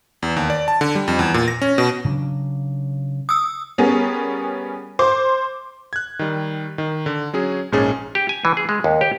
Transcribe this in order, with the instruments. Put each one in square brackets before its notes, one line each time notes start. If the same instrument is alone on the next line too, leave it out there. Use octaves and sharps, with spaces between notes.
[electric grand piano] E2
D#2
D5
A5
D3
G3
F2
E2
A#2
A#6
C#4
B2
[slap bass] C#3 F#3 D4
[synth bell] D#6 E6
[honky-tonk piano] G3 B3 C#4 G#4 A#4
C5 C6 D6
[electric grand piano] F#6 G#6
D#3 G3
D#3
D3
F#3 C#4 G#4
A#1 G#2 A#3 C#4 G#4 A6
[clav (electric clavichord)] G4
G#5
E3
G#4
G#3
D#2
G4